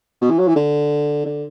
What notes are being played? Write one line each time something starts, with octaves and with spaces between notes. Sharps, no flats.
B2
E3
F#3
E3
D3
D3